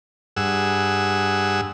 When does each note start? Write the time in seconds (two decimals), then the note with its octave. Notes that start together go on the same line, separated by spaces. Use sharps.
0.37 G2 G#4 F#5 E6